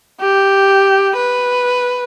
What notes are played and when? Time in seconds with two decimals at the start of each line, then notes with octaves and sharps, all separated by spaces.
0.21 G4
1.17 B4